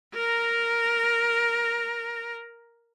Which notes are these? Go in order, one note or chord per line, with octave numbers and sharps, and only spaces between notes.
A#4 A#5